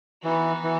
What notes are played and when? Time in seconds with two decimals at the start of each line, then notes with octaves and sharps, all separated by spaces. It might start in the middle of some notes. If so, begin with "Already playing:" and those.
0.24 E3 B3 D#4 F#4
0.64 E3